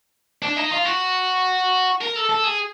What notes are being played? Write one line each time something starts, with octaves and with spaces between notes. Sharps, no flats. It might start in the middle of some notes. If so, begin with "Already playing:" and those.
D4
D#4
F4
F#4
A#4
A4
A4
G#4